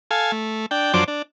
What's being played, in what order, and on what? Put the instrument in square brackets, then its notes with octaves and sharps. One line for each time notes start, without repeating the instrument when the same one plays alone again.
[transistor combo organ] A4 F5 G#5
A3
D4 G5
F#2 F3 F#3 D4 C5 D6
D4